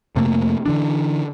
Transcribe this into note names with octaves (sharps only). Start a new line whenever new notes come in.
F2 C3 A3 A#3
D3 E3 D4